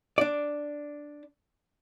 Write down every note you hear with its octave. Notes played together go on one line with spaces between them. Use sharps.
D4 D5